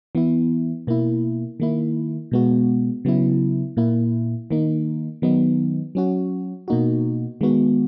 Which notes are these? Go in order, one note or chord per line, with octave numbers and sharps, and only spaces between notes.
E3 B3 E4
B2 A#3 E4
D#3 A#3 E4
B2 G#3 B3 F#4
C#3 F#3 B3 E4
A#2 A#3 E4
D#3 A#3 D#4
D#3 F#3 B3 D#4
F#3 C#4 F#4
B2 A#3 D#4 F#4
D#3 G#3 B3 F#4